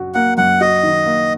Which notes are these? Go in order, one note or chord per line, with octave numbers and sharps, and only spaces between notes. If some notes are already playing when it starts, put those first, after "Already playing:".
Already playing: F#2 F#3 F#4
A#3 F#5
F#2 F#5
F#4 D#5
D#3
A#3